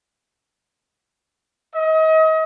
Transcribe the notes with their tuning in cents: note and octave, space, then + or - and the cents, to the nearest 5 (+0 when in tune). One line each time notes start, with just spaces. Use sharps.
D#5 +35